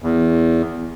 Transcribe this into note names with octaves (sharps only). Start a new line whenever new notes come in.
E2